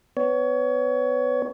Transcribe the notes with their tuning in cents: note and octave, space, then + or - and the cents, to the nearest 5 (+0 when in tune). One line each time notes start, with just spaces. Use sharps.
B3 +30 C#5 +25